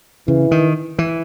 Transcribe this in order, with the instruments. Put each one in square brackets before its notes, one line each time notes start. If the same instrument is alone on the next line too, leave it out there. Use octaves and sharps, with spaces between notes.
[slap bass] C#3 [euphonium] E3
[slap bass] D#3
E3